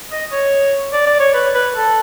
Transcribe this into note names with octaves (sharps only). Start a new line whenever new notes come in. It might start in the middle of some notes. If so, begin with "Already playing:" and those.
D#5
C#5
D5
D5
C#5
B4
B4
A4